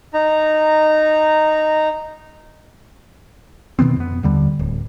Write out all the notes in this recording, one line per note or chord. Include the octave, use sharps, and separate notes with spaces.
D#4 A#5
B2 D#3 B3 C4
F2 B3
D#2 D3 G3
D1